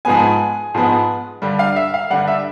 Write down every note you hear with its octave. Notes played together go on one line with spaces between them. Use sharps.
G#2 F3 G#3 B3 G#5
G#2 F3 G#3 B3
G2 D3 G3
F5
E5
F5
G2 D3 G3 F#5
E5